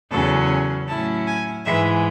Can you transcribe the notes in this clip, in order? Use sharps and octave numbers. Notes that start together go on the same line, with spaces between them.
E2 C#3 F#3 C#4 A4
A2 F#3 C#4 E4 A5
G#5
G#2 E3 G#3 E5